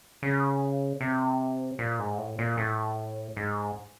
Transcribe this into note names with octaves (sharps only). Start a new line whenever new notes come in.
C#3
C3
A#2
G#2
A2
A#2
A2
G#2